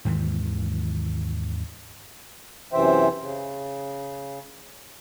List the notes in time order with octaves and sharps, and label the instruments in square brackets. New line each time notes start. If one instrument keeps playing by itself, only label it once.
[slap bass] D#2 G#2 D#3 E3
[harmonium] F#2 C3 E3 C5 E5 G5
C#3